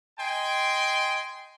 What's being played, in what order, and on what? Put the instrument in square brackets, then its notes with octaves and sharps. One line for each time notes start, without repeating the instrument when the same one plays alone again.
[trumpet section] D#5 G5 G#5 C6